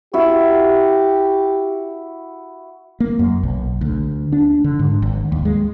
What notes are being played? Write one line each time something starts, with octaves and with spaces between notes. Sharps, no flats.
E4 F#4 G4
A#3
F#2
B1
D2
D4
D3
G#2
G#1
D#2
G#3